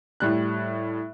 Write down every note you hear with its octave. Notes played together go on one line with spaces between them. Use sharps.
A2 G3 F#6